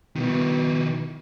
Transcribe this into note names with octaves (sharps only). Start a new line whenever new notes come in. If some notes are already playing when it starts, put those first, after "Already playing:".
B2 D#3 E4